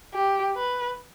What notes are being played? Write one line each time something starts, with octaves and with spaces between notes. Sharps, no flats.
G4
B4